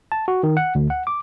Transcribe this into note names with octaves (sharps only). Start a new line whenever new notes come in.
A5
F#4
D#3
F#5
D2
F#5
D6